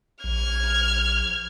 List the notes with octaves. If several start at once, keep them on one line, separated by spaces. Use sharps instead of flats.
A#1 F6 G#6